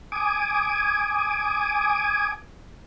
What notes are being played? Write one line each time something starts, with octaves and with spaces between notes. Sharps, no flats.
G#5 D6 D#6